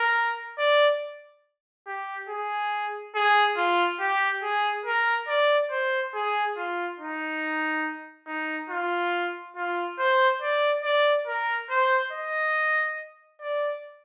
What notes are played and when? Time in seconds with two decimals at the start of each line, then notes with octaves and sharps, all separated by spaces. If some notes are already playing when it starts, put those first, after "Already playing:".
Already playing: A#4
0.59 D5
1.87 G4
2.29 G#4
3.15 G#4
3.57 F4
4.00 G4
4.43 G#4
4.86 A#4
5.29 D5
5.71 C5
6.15 G#4
6.58 F4
7.00 D#4
8.27 D#4
8.70 F4
9.56 F4
9.99 C5
10.42 D5
10.84 D5
11.27 A#4
11.70 C5
12.13 D#5
13.41 D5